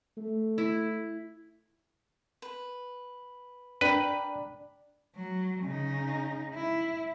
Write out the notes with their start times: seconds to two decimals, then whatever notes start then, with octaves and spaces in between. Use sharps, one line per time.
0.17 A3
0.58 E4
2.42 B4
3.81 D4 A#4 B4 G5 B5
5.15 F#3
5.64 C#3 D#4
6.54 E4